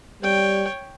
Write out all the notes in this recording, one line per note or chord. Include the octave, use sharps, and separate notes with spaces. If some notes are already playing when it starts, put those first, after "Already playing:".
G3 C#5 G5